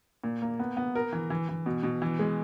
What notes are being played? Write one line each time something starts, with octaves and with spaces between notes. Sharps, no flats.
A#2
A#3
B3
B3
A#4
E3
E3
E3
B2
B2
E3
G#3